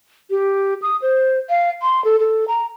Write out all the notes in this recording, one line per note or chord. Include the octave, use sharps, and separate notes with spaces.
G4
D#6
C5
F5
C6
A4
A4
A#5